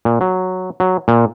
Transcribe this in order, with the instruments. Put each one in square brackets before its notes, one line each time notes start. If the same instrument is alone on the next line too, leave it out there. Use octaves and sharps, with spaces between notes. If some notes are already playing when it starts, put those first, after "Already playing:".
[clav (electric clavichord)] A#2
F#3
F#3
A#2